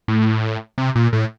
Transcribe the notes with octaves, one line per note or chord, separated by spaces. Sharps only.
A2
C3
A#2
A2